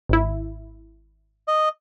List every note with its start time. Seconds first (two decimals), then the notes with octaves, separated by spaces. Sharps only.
0.09 G#1 E4
1.48 D#5